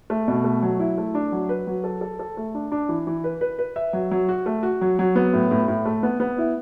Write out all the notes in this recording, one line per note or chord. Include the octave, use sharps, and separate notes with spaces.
A3
B2
A3
F#3
E4
A3
D4
F#3
B4
F#3
A4
A4
A4
A3
D4
D4
E3
E3
B4
B4
B4
E5
F#3
F#3
F#4
A3
F#4
F#3
F#3
B3
A2
A2
A2
A3
B3
B3
E4